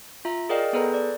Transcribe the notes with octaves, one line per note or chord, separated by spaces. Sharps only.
F4 E5 A#5
G#4 A#4 D5 D#5 F5 G5
B3 G#4 A4 B4 C5 A#5
D5